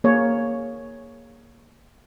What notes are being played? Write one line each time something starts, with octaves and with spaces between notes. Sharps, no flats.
A#3 G#4 C#5